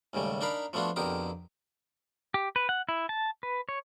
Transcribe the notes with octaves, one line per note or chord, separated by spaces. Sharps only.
D#2 G#2 C#3 G3 A3
D4 D#4 A#4 D5 F5 B5
F3 A3 B3 D4 F4 F#4
F2 B2 D3 G4 A#4 D#6
G4
B4
F#5
E4
A5
B4
C#5